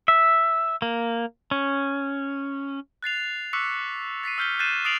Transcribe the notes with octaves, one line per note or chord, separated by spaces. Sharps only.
E5
A#3
C#4
F#6 A6 C7 F7
C#6 D6 E6 F#6 B6 C#7
A6 B6 C7 D#7
E6 F6 G6 B6 G7
F#6 G6 A6 C7 D#7 E7
D#6 A6 C7 D7 F7 F#7